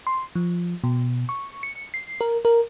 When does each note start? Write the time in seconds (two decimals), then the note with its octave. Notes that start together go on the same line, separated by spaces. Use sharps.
0.07 C6
0.35 F3
0.84 B2
1.29 C#6
1.63 C#7
1.94 C7
2.21 A#4
2.45 A#4